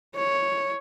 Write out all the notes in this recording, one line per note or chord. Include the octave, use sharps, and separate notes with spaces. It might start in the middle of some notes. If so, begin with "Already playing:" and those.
C#5